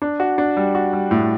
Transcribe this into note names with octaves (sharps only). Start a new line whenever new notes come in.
D4
F#4
D4
G3
F#4
G3
A2